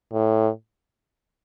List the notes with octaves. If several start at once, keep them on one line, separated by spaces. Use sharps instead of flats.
A2